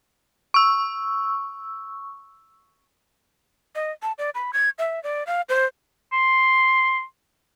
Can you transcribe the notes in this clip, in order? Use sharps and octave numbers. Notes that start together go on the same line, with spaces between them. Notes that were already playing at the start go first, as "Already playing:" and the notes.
C#6 E6
D#5
A5
D5
B5
G#6
E5
D5
F5
C5
C6